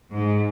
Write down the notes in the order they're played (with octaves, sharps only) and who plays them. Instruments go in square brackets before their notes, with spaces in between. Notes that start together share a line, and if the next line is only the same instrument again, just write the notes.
[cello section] G#2